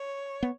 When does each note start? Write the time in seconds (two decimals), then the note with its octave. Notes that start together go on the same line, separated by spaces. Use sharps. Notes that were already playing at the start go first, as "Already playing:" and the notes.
Already playing: C#5
0.43 B3